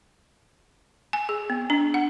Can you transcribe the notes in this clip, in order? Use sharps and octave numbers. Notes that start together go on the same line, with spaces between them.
G#5
G#4
B3
D4
F#5